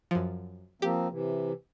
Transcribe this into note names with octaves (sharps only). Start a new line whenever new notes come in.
F#2 F3
F3 A#3 C4 G4
C3 E3